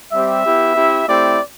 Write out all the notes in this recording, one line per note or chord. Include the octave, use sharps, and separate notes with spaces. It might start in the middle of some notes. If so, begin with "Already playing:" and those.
G3 C4 G4 E5
B3 E4 G4
C4 E4 G4
A3 C4 E4 G4 D5